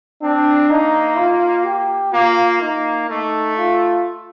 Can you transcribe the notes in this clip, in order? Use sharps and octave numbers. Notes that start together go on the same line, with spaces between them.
C4 D4
A#3 D#4
F4
G4
A#3 F4
A#3 D#4
A3 D#4
F4